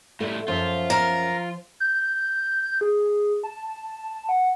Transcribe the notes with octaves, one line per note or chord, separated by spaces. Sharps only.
A2 G3 A3
F#2 F3 F4 E5
A#4
G6
G#4
A5
F#5